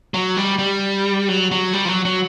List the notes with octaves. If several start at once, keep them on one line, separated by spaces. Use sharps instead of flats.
F#3
G3
G3
F#3
F#3
G3
F3
F#3
F#3